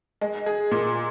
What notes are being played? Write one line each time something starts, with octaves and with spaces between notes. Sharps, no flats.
G#3
G#4
A#2